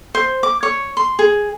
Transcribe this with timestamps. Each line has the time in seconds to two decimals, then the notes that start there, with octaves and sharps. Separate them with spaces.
0.15 C5
0.43 D6
0.63 C#5
0.97 C6
1.19 G#4